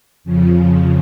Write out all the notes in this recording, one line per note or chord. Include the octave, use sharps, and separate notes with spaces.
F2 C#3 F3